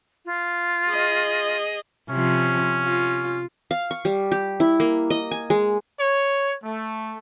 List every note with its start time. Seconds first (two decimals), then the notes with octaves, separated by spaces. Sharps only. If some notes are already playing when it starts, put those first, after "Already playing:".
0.25 F4
0.87 G#4 D#5
2.10 C3 F3 C#4
2.85 F4
3.71 F5
3.91 C#6
4.05 G3
4.32 G4
4.60 E4
4.80 A#3
5.10 D#5
5.31 G#5
5.50 G#3
5.98 C#5
6.63 A3